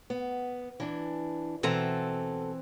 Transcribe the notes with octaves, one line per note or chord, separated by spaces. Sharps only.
B3
E3 D4
B2 E3 C4 A4 A#5